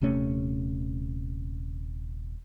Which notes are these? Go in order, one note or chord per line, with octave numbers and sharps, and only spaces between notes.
D#1 C3 A3 C#4